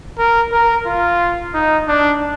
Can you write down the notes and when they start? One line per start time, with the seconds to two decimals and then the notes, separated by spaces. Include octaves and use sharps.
0.18 A#4
0.52 A#4
0.86 F4
1.54 D#4
1.88 D4